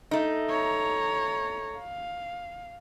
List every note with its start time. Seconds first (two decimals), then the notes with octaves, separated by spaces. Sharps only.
0.11 A3 D#4
0.49 C#5 A#5
1.78 F5